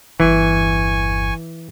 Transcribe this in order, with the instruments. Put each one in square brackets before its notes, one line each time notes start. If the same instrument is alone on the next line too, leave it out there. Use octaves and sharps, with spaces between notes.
[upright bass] G1 E2 [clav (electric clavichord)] E3 [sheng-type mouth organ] G#5 C#6